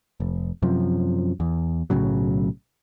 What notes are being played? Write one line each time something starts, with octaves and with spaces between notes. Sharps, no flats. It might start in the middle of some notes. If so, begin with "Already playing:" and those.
F1
F#2 C3 F3
E2
B1 A2 C#3 F#3